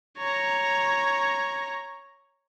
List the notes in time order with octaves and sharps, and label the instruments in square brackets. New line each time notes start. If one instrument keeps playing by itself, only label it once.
[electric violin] C#5 A#5